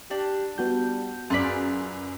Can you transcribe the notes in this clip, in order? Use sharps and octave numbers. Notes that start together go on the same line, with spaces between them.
D4 G4
G3 B3 F#4 G6
F#2 F4 G#4 B4 D5 B6